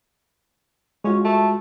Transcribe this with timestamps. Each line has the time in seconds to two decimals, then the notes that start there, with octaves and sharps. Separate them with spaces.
1.04 G#3 C#4 F4 F#4
1.24 A3